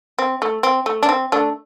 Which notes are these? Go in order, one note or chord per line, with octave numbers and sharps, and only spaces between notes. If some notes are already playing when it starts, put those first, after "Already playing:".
C4
A3
C4
A3
D4
C4
A3 D4